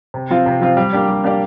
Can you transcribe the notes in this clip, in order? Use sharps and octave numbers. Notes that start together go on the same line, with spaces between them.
C3
F3 C4 F4
C3
F3 C4 F4
G3
A#3 D4 G4 D5
G3
A#3 D4 G4 D5